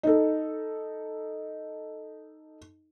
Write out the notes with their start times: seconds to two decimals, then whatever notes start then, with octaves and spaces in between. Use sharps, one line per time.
0.03 D#4 A4